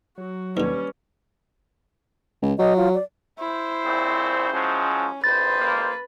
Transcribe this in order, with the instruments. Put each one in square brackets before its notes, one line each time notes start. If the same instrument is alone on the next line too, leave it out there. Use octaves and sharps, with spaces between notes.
[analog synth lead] F#3 [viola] F#4
[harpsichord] D#2 D3 [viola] G3 C#4 [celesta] B4
[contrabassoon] C#2
[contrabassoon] F#3 [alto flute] D#5
[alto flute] F4
D5
[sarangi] E4 [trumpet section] C5
[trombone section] A#1 C#3 C4
[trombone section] F3 F#3 G#3 [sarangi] C#4
[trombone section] G#1 F2 C5 [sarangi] B4 [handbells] A6
[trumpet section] A#3